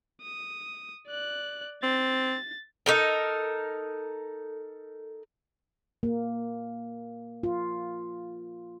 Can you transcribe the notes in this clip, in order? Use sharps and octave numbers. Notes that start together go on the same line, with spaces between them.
D#6
D5 F#6
C4 A6
D#4 A4 A#4
A#3
F4